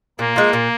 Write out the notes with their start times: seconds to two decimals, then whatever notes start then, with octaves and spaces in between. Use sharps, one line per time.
0.19 A#2 A#3
0.36 F3 G#3
0.53 A#2